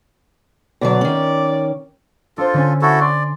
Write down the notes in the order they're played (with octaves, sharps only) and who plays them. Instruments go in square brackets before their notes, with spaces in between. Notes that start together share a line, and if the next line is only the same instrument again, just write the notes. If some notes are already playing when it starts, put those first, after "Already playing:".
[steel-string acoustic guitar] B2 D3 F#3 [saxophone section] D5
[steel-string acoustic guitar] D#3 C#4
[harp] D4 C5 [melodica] F4 A4
[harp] D3 C#4 G#5
[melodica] E4 F#4 A4
[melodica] D5 [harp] C6